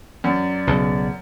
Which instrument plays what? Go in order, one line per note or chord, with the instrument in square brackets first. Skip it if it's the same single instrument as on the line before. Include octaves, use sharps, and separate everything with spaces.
[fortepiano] F#2 [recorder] D5
[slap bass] B1 C#3